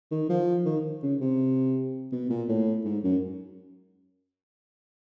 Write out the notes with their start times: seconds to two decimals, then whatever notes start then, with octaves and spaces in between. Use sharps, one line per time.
0.11 D#3
0.29 F3
0.65 D#3
1.03 C#3
1.21 C3
2.12 B2
2.30 A#2
2.48 A2
2.85 G#2
3.04 F#2